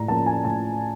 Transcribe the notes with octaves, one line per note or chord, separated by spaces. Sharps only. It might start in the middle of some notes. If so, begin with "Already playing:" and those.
Already playing: A2 A#5
F3 A#3 C#4 A5
G#5
A2 A5